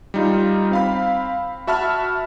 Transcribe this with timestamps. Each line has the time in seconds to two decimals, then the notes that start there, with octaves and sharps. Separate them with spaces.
0.14 G3 D#4 F4
0.71 C4 F5 B5
1.67 F#4 E5 A5 B5 F6